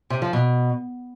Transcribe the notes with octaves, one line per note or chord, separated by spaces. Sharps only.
C3
F3
B2